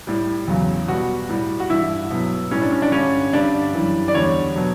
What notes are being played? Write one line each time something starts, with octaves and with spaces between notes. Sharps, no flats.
A2 G3
E2 C#3 F#3
B2 G3 F#4
A2 G3
F#4
G2 E3 G3 E4
B2 F#3
A2 G3 C#4
D4
C#4
D4
G2 D3 G3 C#4
G2 D3 G3 D4
F#2 E3 G3
D5
E2 D3 G3 C#5
B2 F#3